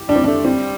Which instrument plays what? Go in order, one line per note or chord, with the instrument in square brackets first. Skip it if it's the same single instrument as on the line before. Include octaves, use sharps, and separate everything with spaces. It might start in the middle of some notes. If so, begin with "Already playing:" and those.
Already playing: [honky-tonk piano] G4
[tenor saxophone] G3 [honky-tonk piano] D4
[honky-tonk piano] C4
[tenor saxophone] A3 [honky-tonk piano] D4
[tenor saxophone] G3 [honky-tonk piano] C4